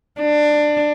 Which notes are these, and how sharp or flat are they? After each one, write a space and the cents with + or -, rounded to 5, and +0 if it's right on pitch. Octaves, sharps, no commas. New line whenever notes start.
D4 +15